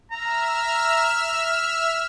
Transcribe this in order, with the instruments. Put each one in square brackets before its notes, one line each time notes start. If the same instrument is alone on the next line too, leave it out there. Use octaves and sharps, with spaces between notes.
[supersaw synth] E5 E6 F6 [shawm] A#5